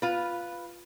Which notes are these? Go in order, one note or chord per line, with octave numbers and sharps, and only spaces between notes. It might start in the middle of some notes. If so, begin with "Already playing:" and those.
F4 B4